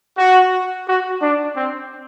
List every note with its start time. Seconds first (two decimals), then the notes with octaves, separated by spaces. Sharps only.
0.17 F#4
0.87 F#4
1.21 D4
1.56 C4